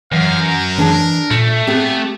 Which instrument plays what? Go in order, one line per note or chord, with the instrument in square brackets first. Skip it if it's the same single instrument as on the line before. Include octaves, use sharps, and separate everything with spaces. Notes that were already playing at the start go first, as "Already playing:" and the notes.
[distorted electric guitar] F#2 [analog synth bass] E3 [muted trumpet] F5
[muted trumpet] A#4
[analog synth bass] E3 [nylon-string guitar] D4 G#4 A5
[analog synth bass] A#2 [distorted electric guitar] A3
[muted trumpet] B3 [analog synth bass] C4 [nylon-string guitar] G4 G#4